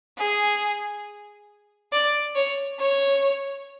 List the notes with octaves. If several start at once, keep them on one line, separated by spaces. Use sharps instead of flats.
G#4
D5
C#5
C#5